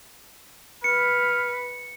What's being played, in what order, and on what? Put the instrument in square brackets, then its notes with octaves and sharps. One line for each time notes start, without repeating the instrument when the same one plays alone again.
[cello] B4 [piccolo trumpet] F6 [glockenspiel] C#7